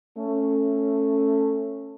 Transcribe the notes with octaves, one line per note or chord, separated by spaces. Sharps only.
A3 C#4